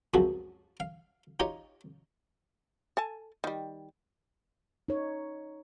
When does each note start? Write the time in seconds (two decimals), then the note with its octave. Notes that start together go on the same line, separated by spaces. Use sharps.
0.14 C#2 F#2 C3 F3 F#4 G#4
0.80 F5
1.40 D#4 F4 G4 C#5 D#5
2.97 A4 G#5 A5
3.44 D#3 G3
4.89 D#4 C#5